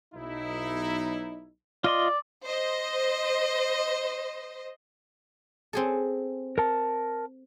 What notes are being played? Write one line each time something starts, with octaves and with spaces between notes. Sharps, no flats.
B1 D#4 E4
F4 D5 D#5 C6
C5 D#5
C4 G#4 A4
A#4 A5